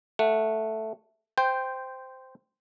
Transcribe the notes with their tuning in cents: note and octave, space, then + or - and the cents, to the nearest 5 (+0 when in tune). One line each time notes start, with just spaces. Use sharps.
A3 +0 F#5 -10
C5 -10 G5 +5